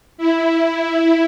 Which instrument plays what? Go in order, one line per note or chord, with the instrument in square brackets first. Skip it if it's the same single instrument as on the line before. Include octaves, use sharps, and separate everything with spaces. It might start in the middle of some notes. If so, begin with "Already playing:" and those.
[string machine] E4